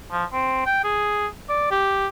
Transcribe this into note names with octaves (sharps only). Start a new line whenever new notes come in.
F3
C4
G5
G#4
D5
G4